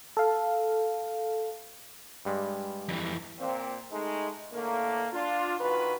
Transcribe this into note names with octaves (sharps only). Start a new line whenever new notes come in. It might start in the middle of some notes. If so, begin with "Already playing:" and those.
A4 F5
G2 G3 G#3
F2 E3
A#2 C4
G#3 A3 D#4
A2 D3 A3 A#3
D4 F4
G2 D#3 F4 F#4 B4